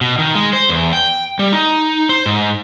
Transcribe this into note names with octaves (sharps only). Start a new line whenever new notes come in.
B2
D#3
G#3
C5
E2
G5
G3
D#4
C5
G#2